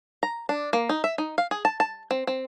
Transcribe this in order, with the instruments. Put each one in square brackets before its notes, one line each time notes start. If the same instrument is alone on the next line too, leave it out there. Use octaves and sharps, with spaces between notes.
[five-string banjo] A#5
D4
A#3
D#4
E5
D#4
F5
G#4
A5
A5
C4
C4